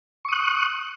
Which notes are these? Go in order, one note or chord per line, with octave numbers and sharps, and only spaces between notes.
C#6 D#6 F#6